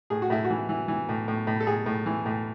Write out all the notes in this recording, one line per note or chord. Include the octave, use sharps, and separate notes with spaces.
A2 G#4
F#4
A2 E4
F#4
E3
E3
E3
A2
A2
A2
A4
A2 G#4
A2
E3
A2